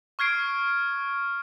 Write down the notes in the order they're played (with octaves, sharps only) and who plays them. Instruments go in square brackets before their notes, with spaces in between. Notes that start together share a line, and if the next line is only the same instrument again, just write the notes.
[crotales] C#6 F6 G#6 C7 D7